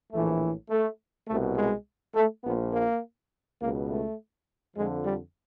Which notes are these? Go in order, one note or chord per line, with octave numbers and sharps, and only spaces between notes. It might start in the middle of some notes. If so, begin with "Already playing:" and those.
A#1 A2 E3 A3
A3
C2 B2 A3
G#3
A3
A#1 A#2 F3 B3
A#3
C#2 B2 A#3
A3
F2 D3 F3 G#3
G3